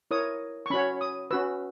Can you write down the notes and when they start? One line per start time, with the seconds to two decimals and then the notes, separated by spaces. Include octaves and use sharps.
0.11 E4 A#4 C#5 D#6
0.66 C#6
0.70 C#4 F#4 C#5 B5
1.01 D#6
1.31 C#4 F#4 B4 E6